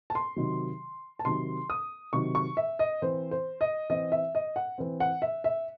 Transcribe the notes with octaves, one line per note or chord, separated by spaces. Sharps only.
A5
C6
C3 D#3 F#3
A5
C3 D#3 F#3 C6
D#6
C3 D#3 F#3 C#6
C#6
E5
D#5
E3 C4 C5
C5
D#5
E3 C4 D#5
E5
D#5
F#5
E3 C4
F#5
E5
E5